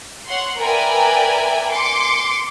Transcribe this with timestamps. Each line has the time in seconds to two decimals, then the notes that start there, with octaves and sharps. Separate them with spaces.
0.27 C#5 F#5 C6
0.59 A#4 B4 D5 E5 G5 G#5
1.72 C6 D6 C#7